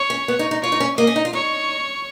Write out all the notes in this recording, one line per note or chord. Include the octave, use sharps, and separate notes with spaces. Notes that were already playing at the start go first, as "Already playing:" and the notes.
Already playing: C#5
C#4
B3
D#4
D#4
F4 C#5
D#4
C#4
A#3 D#5
C#4
D#4
F4
D#4 C#5